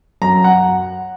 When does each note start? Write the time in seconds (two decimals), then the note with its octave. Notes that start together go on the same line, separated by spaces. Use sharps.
0.22 F#2 A#5
0.44 F#5